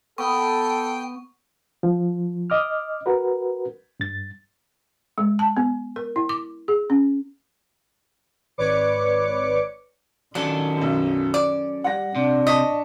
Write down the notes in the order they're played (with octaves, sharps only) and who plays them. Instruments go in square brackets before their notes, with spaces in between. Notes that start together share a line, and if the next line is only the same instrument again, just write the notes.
[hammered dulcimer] B3 [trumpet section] A4 [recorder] G5 [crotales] C#6
[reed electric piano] F3
D#5 D6 F6
F#4 A#4 B4
G2 A6
[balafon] G#3
A5
B3
A#4
E4
D6
G#4
C#4
[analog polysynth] G#1 B4 C#5 D5 D6 C#7
[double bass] D#3 [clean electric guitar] F#3 C#4 A4 [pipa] D4
[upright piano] B1 F#2
[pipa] D5 [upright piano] D6
[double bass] G3 [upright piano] F#5 A#6
[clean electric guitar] C3 [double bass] D4
[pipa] D#5 [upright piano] A5 C#6 B6